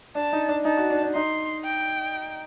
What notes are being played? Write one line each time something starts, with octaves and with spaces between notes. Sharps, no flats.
D4 A5
D#4
D4
D#4 A5
F#4
D4
D4
D#4 C6
G5